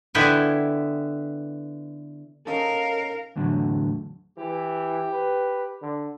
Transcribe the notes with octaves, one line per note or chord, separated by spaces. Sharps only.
D3 B3 E4 B4 G5 G#5
C#4 D#4 A4 A#4 F5
E2 A2 D3 F#3
E3 G4
B4
D3